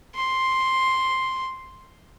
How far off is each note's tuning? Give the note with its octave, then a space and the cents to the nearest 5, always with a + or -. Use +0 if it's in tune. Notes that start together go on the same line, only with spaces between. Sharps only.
C6 +5